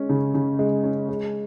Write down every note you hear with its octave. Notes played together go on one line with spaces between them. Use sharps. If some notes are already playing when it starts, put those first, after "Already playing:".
Already playing: G#3 C#4
C#3
C#3
G#3
C#4
G#3